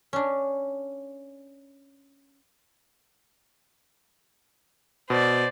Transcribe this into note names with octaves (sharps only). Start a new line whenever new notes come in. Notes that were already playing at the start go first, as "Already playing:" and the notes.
C#4 D4
B2 C5 D5